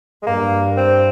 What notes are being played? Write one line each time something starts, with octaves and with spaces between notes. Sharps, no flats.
G#3
G2 A#3
C4